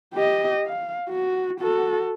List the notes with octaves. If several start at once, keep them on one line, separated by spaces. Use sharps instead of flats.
G4 D#5
F5
F#4
F#4 A4